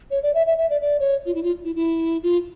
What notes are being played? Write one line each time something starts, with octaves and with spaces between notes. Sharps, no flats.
C#5
D5
E5
E5
E5
D5
D5
C#5
F4
E4
F4
E4
E4
F4